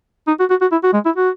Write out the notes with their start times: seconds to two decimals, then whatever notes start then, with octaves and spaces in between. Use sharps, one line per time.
0.27 D#4
0.40 F#4
0.50 F#4
0.61 F#4
0.72 E4
0.83 F#4
0.93 G#3
1.05 E4
1.16 F#4